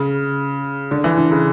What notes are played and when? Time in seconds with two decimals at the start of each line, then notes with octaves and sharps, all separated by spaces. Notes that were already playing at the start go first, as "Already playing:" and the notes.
Already playing: C#3
0.91 D3
1.04 E3
1.18 D3
1.32 C#3